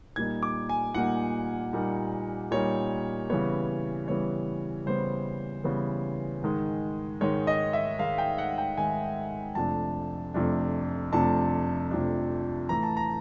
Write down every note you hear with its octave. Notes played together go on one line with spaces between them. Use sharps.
A#2 G3 A#3 D#4 G#6
D6
G#5
A#2 G3 A#3 D#4 F#5
A#2 G3 A#3 D#4
A#2 G3 A#3 D#4 C#5
C#3 E3 G3 B3 C#5
C#3 E3 G3 B3 C#5
C#3 E3 G3 B3 C5
C#3 E3 G3 B3
G#2 D#3 G#3
G#2 D#3 G#3 C#5
D#5
E5
G#2 D#3 G#3 F5
G5
F#5
G5
G#2 D#3 G#3 G#5
F2 C3 F3 A3 D4 A5
F2 C3 F3 A3 D4
F2 C3 F3 A3 D4 A5
F2 C3 F3 A3 D4
A2 E3 A3 A#5
A5
A#5